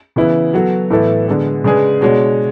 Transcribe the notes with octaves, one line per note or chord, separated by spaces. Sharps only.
C#3 E3 B3 E4 B4
F#3 B3 F#4 A4
A2 E3 B3 E4 A4
D3 G#3 B3
C#3 G#3 D4 G#4 B4
B2 G#3 D4 F#4 C#5